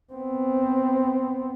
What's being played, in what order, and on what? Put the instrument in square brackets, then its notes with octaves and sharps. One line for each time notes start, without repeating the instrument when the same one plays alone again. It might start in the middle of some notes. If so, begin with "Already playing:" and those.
[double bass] B3 C4